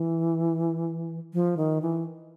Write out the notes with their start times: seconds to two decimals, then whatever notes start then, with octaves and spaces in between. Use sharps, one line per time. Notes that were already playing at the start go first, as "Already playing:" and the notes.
Already playing: E3
1.34 F3
1.57 D#3
1.82 E3